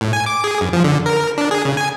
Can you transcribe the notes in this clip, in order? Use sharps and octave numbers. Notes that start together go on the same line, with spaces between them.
A2
G#5
D6
G#4
F#2
F3
D3
A#4
D4
G#4
C#3
G#5